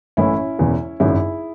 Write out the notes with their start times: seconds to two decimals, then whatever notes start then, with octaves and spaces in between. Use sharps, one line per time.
0.17 A1 A2 E3 C#4 E4
0.59 E1 E2 C#3 E3
1.00 G#1 F#2 C#3 F#3 E4 G#4